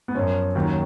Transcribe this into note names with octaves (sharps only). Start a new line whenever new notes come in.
B3
F#2 F3 C#4
D#2 D#3 F#3